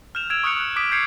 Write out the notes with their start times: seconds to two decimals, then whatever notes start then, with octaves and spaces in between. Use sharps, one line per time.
0.15 F6 G6 E7 F7
0.30 E6 G#6 D7 E7 F7
0.43 C#6 D#6 F6 F#6 C#7 F7
0.60 F#6
0.76 D6 D#6 B6 D7
0.92 G6 G#6 C7 C#7 F7